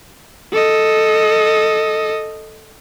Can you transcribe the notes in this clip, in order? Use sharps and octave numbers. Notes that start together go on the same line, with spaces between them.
A4 D#5